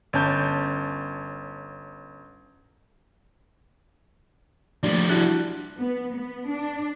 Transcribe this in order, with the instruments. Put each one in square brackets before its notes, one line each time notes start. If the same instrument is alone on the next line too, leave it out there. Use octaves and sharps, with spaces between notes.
[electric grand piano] G1 C#4 A5 G6
[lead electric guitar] F3 G3 [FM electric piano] A3 A#3 D4 [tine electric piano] D5
[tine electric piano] D4 F#4 F#6 [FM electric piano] E4
[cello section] B3
B3
D4